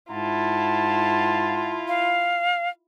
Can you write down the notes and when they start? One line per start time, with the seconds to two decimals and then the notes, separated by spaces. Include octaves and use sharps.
0.10 G#2 E4 F4 F#5 A5
1.88 F5